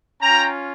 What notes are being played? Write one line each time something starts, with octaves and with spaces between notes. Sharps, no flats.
C#4 F4 G5 A#5